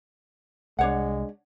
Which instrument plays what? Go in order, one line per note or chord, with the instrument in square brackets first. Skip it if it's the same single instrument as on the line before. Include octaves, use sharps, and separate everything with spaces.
[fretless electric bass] C2 [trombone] G#3 [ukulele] D4 C#5 F#5